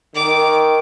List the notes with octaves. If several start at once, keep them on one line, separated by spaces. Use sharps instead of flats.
D#3 D6